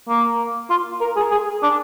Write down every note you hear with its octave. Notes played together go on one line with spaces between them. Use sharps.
A#3
F4
A#4
G#4
G#4
D4